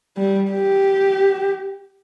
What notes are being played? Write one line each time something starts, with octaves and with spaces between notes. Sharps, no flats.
G3
G4